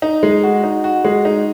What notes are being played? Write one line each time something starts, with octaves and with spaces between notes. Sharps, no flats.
D#4
G#3
F#4
D#4
F#4
G#3
D#4